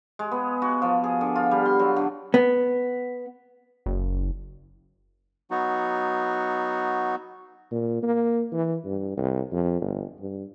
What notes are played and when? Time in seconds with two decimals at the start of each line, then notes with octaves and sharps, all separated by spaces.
0.19 G#3
0.32 B3
0.62 F#4
0.82 F3
1.04 G#4
1.21 D3
1.36 F4
1.51 G3
1.66 C6
1.79 F#3
1.96 D3
2.34 B3
3.86 F#1
5.51 F#3 B3 D#4 F#4
7.71 A#2
8.03 A#3
8.52 E3
8.85 G2
9.17 C2
9.52 F2
9.81 G1
10.20 G2